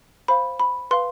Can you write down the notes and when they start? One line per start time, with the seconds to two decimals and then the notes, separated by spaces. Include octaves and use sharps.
0.28 C5 F5 B5
0.60 B5
0.91 B4 F5 C6